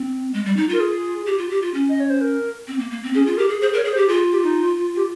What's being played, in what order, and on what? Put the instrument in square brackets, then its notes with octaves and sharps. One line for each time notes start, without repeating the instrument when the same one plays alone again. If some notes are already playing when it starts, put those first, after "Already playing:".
Already playing: [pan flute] C4
G#3
G3
D#4
[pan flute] F4 [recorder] A#4
[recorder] G#4
[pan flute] G4
F4
G4
F4
C#4
[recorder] D#5
C#5
C5
A#4
[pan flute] C4
A#3
A#3
C4
[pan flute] C#4 [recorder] G#4
[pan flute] F4
[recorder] G#4
[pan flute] G4 [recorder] A#4
[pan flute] G#4
[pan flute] G#4 [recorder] C5
[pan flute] A#4 [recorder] C#5
[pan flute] G#4
[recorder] C5
[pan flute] G4
[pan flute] F4 [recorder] G#4
[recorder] G4
D#4
G4